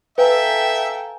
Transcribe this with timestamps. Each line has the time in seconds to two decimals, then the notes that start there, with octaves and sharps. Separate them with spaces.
0.18 A4 B4 E5 F5 G5 G#5 A#5